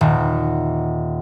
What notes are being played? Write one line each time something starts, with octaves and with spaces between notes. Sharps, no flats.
D#1